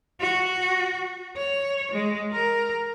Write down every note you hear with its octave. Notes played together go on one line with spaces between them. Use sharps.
F#4
C#5
G#3
A#4